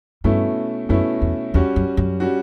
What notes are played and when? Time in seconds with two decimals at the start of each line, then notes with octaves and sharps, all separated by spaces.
0.24 G2 B2 A3 C#4 E4
0.89 F#2 B2 A3 C#4 E4
1.22 E2
1.54 E2 G3 C#4 F#4
1.76 F#2
1.97 F#2
2.20 G3 C#4 F#4